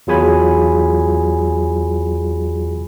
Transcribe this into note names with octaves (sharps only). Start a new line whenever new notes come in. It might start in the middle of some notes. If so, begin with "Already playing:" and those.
E2 F#3 F4 G#4 G#5 B5